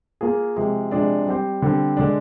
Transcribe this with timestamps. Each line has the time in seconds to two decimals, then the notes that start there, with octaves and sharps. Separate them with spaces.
0.21 A#3 F4 G#4
0.56 C3 F3 G#3
0.91 C3 F3 G#3 D4
1.27 G3 C4 G4 C5
1.62 D3 G3 C4
1.97 D3 G#3 D4